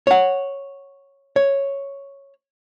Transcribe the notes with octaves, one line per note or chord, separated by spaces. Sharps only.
C#5 F#5
C#5